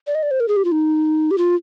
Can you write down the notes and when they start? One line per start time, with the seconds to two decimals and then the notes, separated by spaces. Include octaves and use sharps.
0.07 D5
0.15 D#5
0.23 D5
0.31 C5
0.40 A#4
0.48 G#4
0.57 G4
0.65 F4
0.72 D#4
1.31 G4
1.38 F4